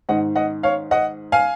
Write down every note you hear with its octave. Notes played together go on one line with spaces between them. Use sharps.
G#2 D#3 D#5 F#5
D#5 F#5
C#5 F5
D#5 F#5
F5 G#5